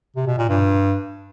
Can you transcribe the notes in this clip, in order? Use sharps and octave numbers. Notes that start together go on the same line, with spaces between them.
C3
B2
A#2
G2